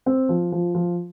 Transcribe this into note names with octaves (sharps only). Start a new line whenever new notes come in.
C4
F3
F3
F3